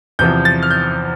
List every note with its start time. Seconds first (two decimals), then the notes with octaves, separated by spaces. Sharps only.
0.19 E2 C3 F3 G6
0.45 A6
0.63 F6
0.71 G6